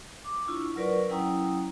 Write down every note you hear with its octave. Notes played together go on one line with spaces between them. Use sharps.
D6
D4 E4 F4 C#6
F#3 F4 A#4 B4 D5 C#6
F#3 C#4 E4 G5 A#5 D#6